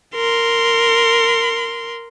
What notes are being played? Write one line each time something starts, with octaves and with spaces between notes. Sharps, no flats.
A#4 C6